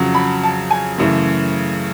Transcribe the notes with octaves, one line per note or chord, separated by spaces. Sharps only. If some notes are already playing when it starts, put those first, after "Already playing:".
Already playing: F2 C#3 F#3
B5
A5
G#5
F#2 C#3 E3 A3